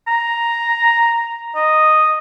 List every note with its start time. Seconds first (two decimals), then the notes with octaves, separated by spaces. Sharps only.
0.08 A#5
1.55 D#5